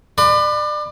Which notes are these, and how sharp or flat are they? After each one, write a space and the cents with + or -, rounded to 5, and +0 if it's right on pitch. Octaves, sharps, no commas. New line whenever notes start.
B4 +0 D5 +30 B5 +35